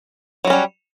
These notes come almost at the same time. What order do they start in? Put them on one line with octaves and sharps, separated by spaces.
F#3 F#4 C#4 G3